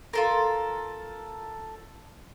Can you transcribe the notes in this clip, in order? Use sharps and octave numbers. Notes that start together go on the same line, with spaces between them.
F4 A4 A#4